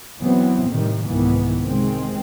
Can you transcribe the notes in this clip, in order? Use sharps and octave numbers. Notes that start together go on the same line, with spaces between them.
E3 F#3 B3 C4
A2 C3 D#3 G3
C2 G#2 D#3 E3 B3
C3 D#3 G#3 C4